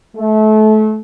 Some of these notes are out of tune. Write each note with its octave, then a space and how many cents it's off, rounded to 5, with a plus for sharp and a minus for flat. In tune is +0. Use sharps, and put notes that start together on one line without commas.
A3 -30